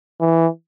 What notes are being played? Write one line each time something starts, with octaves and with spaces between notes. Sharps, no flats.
E3